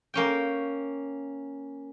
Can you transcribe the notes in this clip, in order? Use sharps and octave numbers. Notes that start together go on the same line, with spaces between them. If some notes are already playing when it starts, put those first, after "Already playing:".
A#3 C#4 G5